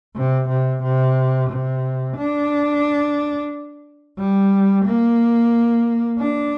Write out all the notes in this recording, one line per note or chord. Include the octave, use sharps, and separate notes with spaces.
C3
C3
C3
C3
D4
G3
A#3
D4